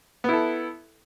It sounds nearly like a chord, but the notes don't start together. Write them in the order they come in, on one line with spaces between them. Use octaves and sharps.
B3 E4 A4